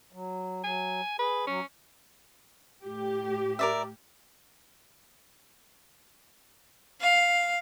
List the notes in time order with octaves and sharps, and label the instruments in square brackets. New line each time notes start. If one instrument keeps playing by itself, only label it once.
[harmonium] F#3
[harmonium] F#3 [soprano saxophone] G#5
[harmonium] G#4 [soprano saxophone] B4
[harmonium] F#3 [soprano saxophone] C#4
[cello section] A2 G4
[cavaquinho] A#4 D5 E5
[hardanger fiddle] F5